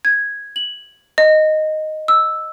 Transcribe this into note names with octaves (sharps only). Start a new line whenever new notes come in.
G#6
F#7
D#5
E6